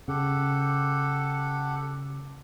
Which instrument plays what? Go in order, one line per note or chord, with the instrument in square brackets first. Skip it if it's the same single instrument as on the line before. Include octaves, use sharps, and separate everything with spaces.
[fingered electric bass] C#3 [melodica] G4 A4 F#5